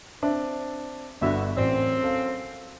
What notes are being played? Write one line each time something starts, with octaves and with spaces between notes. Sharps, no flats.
C4 D4 E5
G1 B3 F#4 E5
A1 F#2 C4 D5
A4 F5